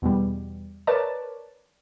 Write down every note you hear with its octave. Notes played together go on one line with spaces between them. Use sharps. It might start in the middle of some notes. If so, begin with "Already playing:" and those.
E2 B2 G3
A#4 B4 C#5 D5 A5